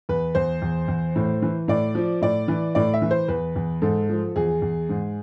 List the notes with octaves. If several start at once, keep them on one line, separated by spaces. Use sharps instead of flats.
E2 B4
E2 C5
E2
E2
A2
E3
A2 D5
F3
A2 D5
E3
A2 D5
E5
E3
C5
E2 B4
E2
G#2 A4
F3
E2 G#4
E2
G#2